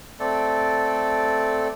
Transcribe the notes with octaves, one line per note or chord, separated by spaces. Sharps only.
A3 C4 A4 D5